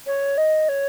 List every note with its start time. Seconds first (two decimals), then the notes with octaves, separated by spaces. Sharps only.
0.07 C#5
0.38 D#5
0.69 C#5